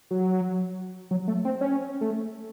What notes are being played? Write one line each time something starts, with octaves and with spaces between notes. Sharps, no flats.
F#3
F#3
A3
C4
C#4
A3